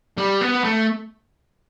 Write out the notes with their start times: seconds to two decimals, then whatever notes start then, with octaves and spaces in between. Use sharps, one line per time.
0.18 G3
0.41 B3
0.64 A3